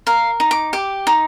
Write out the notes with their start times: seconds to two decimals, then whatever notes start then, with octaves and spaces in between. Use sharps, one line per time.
0.07 A#4 F5
0.40 D#4
0.51 D6
0.73 G4 D6
1.07 D#4